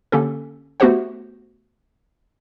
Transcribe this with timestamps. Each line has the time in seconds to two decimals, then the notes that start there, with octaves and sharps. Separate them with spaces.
0.12 D3 A#3 C#4 G4 A4
0.80 A3 B3 F#4 G4 C5 F#5